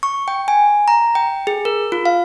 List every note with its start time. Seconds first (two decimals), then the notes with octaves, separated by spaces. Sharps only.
0.03 C#6
0.28 G5
0.48 G#5
0.88 A#5
1.15 G5
1.47 G#4
1.65 A#4
1.92 F4
2.05 F5